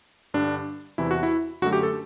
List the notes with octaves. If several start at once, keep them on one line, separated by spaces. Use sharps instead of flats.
G2 D3 G3 D4
E2 C3 E3 E4
F#4
E4
F#2 D3 A3 F#4
G4
A4